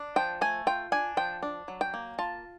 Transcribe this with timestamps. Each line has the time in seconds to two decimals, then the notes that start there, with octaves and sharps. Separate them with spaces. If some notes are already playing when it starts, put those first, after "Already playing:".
Already playing: D4
0.16 F3 G5
0.41 A3 G#5
0.67 F4 G5
0.92 D4 G#5
1.17 F3 G5
1.43 D4
1.68 F#3
1.81 G5
1.94 A#3
2.18 F4 A5